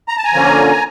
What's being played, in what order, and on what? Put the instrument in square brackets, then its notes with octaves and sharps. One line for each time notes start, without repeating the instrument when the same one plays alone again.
[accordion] A#5
A5
G#5 A#5
D3 F3 A#3 C#4